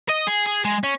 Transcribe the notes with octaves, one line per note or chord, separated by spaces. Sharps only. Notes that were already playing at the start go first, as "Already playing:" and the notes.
D#5
G#4
G#4
G#3
C#4